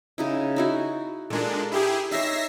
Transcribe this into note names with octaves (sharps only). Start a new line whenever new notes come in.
C#3 D#4 E4
D#4 E4 F#4
A#2 G#3 D4 A4 A#4
E4 G4 G#4
D#4 C#5 E5 A#6 C7